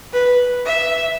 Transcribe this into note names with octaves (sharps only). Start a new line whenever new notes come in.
B4
E5